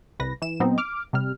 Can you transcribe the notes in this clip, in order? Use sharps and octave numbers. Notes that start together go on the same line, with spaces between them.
C2 B4 A#6
E3 E7
A#2 F#3 B3 C4 D#4
D6 F6
C3 G3 F6